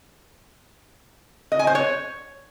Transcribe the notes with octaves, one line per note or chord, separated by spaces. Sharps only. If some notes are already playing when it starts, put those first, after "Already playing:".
D#5
G#5
C5
C#5